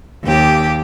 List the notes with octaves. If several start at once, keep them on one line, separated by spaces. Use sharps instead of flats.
D#2 G4